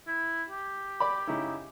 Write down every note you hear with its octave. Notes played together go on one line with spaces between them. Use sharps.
E4
G4
D5 B5
C#3 D#4 E4